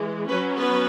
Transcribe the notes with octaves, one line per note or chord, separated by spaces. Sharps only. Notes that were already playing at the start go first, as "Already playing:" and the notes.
Already playing: E3 G#3
F#3 B3 C#4 B4
B3 B4